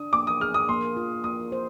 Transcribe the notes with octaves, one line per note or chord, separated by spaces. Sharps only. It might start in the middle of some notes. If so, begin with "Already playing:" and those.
Already playing: D4 D#6
A#3 D6
D#6
G#4 F6
D#6
A#3 C6
F4
A#3 D#6
C5